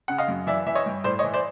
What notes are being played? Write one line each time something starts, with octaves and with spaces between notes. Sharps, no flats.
C#3 F#5
D#5 F5
F#2
E3 D5 E5
E3 E5
C#5 D#5
G2
A2 C5 D5
C#5 D#5
E3
C5 D5